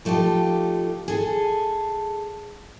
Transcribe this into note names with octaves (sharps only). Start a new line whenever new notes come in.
F3 A3 D#4 F4 G4
G#4 A4 G#5